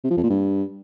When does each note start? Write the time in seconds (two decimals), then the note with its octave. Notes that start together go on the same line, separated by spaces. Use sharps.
0.04 C3
0.11 F3
0.17 F2
0.24 A#2
0.30 G2